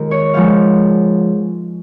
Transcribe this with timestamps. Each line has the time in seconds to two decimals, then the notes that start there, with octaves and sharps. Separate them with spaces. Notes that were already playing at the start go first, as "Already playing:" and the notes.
Already playing: D#2 D#3 G#3 D#4 F4 A#4
0.11 C#5
0.34 G#2 F3 G#3 F5